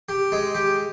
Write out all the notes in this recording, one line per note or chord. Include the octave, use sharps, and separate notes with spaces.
G4
G#3
G4